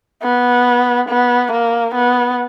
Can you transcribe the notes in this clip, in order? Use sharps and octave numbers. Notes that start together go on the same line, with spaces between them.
B3
B3
A#3
B3